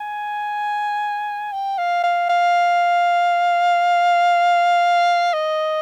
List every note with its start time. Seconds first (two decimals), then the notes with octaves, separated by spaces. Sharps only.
0.01 G#5
1.53 G5
1.78 F5
2.03 F5
2.29 F5
5.33 D#5